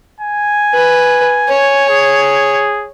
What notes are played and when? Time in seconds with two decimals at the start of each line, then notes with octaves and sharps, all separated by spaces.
0.21 G#5
0.74 B4
1.49 C#5
1.89 G#4